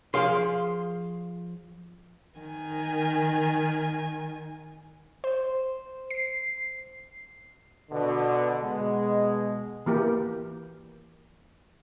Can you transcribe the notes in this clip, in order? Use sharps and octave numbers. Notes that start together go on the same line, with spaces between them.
F3 G#4 F5 C6
D#3 G#5
C5
C7
B2 D3
B2 G#3
E3 A#3 G4